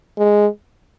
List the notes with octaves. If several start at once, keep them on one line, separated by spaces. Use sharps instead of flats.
G#3